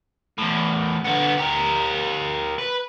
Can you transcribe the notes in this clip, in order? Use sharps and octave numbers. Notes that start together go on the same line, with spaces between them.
E2 A2
D3 B3
G4 A#4
B4